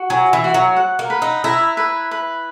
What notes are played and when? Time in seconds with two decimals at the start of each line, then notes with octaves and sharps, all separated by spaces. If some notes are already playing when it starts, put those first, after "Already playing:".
Already playing: F#4
0.10 F#3 G#5
0.33 E3
0.44 F#4
0.54 F#3
0.76 F#5
0.99 A#3
1.10 B4
1.22 D#4
1.44 E4 A#5
1.77 B4
2.11 B4